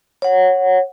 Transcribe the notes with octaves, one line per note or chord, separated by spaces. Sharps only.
C#5 F#5